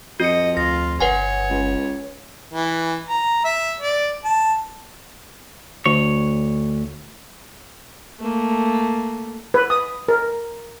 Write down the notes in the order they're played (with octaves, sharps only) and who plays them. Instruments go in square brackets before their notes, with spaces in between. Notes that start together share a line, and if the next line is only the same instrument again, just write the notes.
[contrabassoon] F2 [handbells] F#4 C#7 [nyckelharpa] D#5
[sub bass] D2 [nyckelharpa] F4 [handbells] A#6
[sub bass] G1 [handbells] B4 F#5 G#5 [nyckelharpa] C#5
[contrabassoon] C#2
[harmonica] E3
A#5
E5
D5
A5
[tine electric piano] D2 [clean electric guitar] C#5
[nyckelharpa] A3 A#3
[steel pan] B4
D#6
A#4